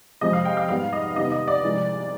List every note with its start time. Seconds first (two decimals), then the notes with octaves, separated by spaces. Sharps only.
0.21 F2 C3 F3 G#3 C4 D#5
0.33 F5
0.45 G5
0.57 F5
0.69 G#2 G3 B3 D#4 F5
0.93 D#5
1.16 C3 D#3 G3 B3 D#5
1.32 D#5
1.48 D5
1.63 C2 C3 F3 G#3